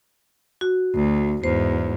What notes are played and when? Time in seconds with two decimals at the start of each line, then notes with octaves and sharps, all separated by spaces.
0.61 F#4
0.94 D2
1.44 E2 G#2 C5